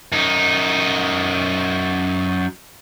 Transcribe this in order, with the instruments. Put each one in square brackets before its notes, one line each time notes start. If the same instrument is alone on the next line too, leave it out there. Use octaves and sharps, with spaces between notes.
[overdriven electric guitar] F#2 D#4